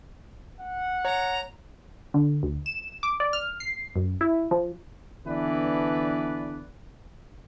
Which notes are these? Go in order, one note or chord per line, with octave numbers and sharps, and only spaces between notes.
F#5
C#5 A#5
D3
D2
E7
D6
D5
F6
C7
F#2
E4
F3
D3 E3 B3 D4 B4 D5